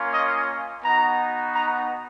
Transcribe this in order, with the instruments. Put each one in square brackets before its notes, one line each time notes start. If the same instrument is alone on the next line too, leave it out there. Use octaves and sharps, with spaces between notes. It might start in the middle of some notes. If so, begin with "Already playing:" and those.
Already playing: [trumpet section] A#3 C#4 F4
D#5
B3 D#4 F#4 A#5
A#5